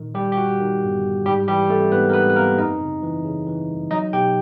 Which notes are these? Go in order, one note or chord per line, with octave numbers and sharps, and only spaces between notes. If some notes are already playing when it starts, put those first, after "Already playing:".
Already playing: A#2 D#3
G1 G3 G4
G4
G1 F#4
D#3
G1
G1
G#2 G3 G4
E3 G3 G4
A3 C4 A4
G#2 B3 B4
A#4
G#2 B3 B4
B4
A#3 C4 A#4
F#2 D#4 D#5
C#3
E3
C#3
E3
G1
F#3 D#4 D#5
B2 G4 G5